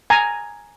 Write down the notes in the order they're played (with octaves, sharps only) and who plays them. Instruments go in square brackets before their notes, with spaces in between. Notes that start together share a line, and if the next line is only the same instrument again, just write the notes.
[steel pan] G#5 A#5